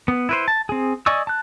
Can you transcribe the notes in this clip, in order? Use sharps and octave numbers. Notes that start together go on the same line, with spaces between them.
B3
E4 B4 C5
A5
C4 G#4
D5 D#5 G#5 C#6 E6
A5 F#6